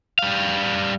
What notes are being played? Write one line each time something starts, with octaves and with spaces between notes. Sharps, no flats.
G3 F5